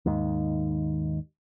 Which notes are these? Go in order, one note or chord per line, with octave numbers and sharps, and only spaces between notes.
D#2 G#2 D#3